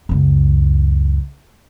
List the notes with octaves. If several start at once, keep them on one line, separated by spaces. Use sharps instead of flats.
C#2 F#2